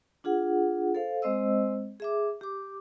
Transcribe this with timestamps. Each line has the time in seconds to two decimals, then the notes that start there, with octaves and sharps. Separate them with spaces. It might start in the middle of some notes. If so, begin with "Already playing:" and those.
0.24 D4 F4 G#4 F#5
0.95 A4 C5 F5
1.22 G#3 C4 C5 D#5 E6
2.00 G#4 E5 D6
2.41 G4 D6